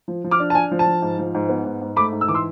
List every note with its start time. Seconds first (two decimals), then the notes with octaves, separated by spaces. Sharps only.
0.08 F3
0.24 F3
0.31 D6 F6
0.40 D4
0.50 A5
0.55 D4 G#5
0.71 F3
0.79 A5
0.86 F3
1.02 G#2
1.19 F3
1.35 G#2
1.49 B3
1.65 G#2
1.81 G#2
1.96 A3 B5 D6
2.12 G#2
2.21 E6
2.28 E3 D6
2.34 C6 E6